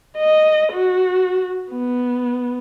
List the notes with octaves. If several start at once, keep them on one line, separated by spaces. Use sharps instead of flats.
D#5
F#4
B3